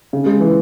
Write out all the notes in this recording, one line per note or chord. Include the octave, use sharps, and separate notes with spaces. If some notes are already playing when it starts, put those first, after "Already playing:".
C#3
G#3
E3